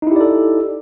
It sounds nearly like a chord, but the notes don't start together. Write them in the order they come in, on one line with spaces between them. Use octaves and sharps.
D#4 E4 G4 D5 A4